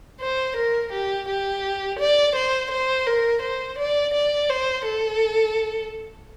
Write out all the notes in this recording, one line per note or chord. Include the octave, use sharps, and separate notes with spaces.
C5
A#4
G4
G4
D5
C5
C5
A#4
C5
D5
D5
C5
A4